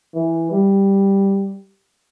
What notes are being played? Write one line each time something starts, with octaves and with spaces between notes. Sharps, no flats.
E3
G3